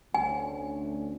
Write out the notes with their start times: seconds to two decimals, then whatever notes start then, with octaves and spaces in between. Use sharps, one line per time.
0.14 D2 C#4 G#5